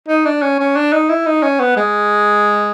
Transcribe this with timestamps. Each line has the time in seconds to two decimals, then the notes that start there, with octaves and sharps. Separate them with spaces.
0.09 D#4
0.26 D4
0.42 C#4
0.60 C#4
0.76 D4
0.93 D#4
1.10 E4
1.27 D#4
1.43 C#4
1.60 B3
1.77 G#3